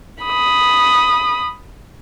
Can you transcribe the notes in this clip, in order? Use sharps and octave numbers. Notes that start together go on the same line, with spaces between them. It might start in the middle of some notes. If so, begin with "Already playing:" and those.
B5 D#6